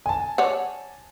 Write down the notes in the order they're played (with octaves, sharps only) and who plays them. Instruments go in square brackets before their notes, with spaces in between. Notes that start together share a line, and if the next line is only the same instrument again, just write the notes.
[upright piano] G#5 A5
[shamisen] C#5 D5 F#5